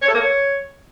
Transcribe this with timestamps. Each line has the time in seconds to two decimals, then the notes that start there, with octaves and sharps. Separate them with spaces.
0.02 C#5
0.08 A4
0.14 A#3
0.20 C#5